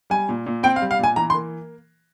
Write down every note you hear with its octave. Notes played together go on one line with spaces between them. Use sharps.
G3 G#5
A#2
A#2
C4 G5
F5
G3
F5
A#2 G#5
E3 A#5
C6
A#3